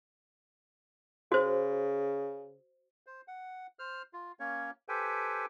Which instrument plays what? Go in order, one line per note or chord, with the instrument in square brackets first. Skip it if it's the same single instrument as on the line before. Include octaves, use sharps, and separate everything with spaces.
[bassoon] C#3 [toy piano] F#4 C5
[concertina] C5
F#5
C5 F6
F4
A#3 C#4 C#5
G4 A4 B4 C5 G5 G#5